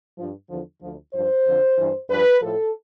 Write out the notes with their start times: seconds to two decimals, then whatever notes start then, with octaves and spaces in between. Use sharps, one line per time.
0.17 G2 F3
0.49 E2 D3 F3
0.81 D2 D3 F3
1.13 G2 F3 C5
1.46 F2 D3 F3
1.77 G2 E3
2.09 G2 F3 B4
2.41 A2 F3 A4